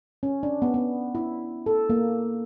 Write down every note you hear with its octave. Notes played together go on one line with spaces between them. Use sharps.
C#4
D4
B3
B3
E4
A4
A#3